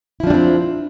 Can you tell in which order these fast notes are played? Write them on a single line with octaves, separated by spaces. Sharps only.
E4 F3 D4 G3 C4